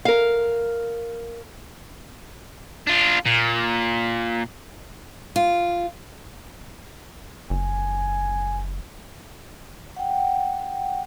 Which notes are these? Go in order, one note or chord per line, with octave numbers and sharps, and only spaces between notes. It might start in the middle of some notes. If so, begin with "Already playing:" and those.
A#4 F5
D4 F4
A#2
F4
F#1 G#5
F#5 G5